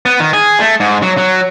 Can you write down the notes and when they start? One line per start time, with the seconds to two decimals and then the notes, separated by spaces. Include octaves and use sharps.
0.06 B3
0.20 D#3
0.33 G#4
0.60 A3
0.80 G#2
1.02 F#3
1.18 F#3